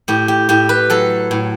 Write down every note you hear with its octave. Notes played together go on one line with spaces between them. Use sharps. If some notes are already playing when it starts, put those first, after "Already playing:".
A2 G4
G4
A2 G4
B4
F#3 A4
A2